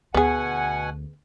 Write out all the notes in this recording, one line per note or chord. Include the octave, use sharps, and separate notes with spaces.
D2 B2 B3 G#4 F#5 G#5